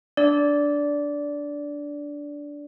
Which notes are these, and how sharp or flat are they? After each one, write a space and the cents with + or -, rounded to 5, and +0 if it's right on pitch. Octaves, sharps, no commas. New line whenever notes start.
D4 -10 D5 -15